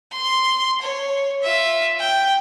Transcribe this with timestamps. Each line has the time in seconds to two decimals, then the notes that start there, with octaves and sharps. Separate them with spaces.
0.12 C6
0.82 C#5
1.42 F4 E5
2.00 G5